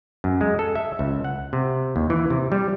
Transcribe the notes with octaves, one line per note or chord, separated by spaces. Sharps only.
F#2
G#3
A4
E5
C#2
F#5
C3
D#2
E3
C3
G3